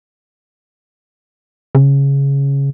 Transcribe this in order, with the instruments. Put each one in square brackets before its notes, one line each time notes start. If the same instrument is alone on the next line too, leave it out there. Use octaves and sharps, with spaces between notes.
[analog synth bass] C#3